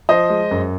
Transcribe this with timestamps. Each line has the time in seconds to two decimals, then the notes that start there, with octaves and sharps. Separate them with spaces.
0.09 F3 C5 D#5
0.30 G#3
0.51 F#2